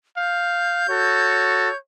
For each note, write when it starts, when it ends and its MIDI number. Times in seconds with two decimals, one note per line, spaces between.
0.17 0.87 77
0.17 1.76 91
0.89 1.67 66
0.89 1.67 69
0.89 1.77 73